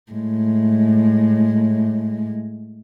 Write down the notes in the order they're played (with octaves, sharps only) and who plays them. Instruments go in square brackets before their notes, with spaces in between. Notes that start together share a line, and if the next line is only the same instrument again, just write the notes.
[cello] A2 G#3